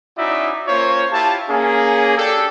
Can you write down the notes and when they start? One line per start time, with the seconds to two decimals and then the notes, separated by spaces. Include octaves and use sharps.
0.17 C#4 D#4 E4 F#4 D5 E5
0.67 A#3 C#4 F4 C5 C#5
1.11 E4 F4 G4 A5
1.48 A#3 C#4 G#4
2.17 D4 G4 A4